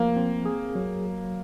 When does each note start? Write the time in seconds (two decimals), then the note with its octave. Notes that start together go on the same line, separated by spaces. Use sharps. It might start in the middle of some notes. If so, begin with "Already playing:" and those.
Already playing: F3 A#3
0.16 C4
0.45 G#4
0.75 F#3